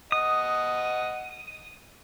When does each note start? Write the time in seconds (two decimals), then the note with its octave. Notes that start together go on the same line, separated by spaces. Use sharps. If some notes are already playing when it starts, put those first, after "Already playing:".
0.12 D#5 F#5 D#6